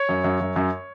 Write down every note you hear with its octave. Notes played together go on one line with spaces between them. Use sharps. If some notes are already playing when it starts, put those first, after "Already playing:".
Already playing: C#5
F#2
F#2
F#2
F#2